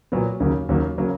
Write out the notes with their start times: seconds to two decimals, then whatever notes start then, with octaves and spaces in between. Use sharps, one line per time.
0.12 A#2 F#3 B3
0.40 D#2 C#3 F#3 A#3
0.69 D#2 C#3 F#3 A#3
0.98 C#3 F#3 A#3